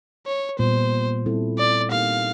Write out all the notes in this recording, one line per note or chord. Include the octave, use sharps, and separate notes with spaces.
C#5
A#2 G3 B3 C5
G3 C4 E4 A4
D5
A#3 D#4 G4 A#4 F5